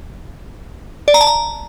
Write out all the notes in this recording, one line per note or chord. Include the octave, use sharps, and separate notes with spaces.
D5
A#5
A5
A#5